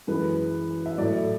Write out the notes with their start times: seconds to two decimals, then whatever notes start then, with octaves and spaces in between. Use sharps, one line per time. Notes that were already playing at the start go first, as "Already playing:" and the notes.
0.07 F#2 E3 G#3 B4
0.86 E5
0.98 A2 F#3 D5